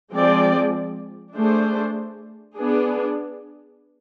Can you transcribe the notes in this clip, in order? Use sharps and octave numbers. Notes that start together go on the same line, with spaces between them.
F3 G#3 C4 G#4 D5
A3 D4 G#4 C5
B3 D4 G#4